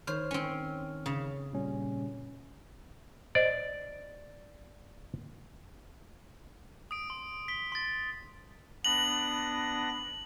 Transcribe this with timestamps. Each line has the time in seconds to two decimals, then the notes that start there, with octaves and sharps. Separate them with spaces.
0.07 D#3 C5 C#5 F6
0.31 C4 C#4
1.06 C#3
1.53 A#2 G3 C#4
3.35 C5 D5 D#5
6.91 D#6 D7
7.10 C6
7.48 B6 G7
7.72 C6 A6
8.85 B3 D4 A#6 F#7